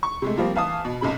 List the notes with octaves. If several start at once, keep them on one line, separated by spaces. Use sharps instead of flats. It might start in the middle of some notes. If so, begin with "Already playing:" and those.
C#6
C3 G#3 A3
F3 G3 A#3 C4
E3 F5 A5 D#6
B2
B1 F#2 C3 B5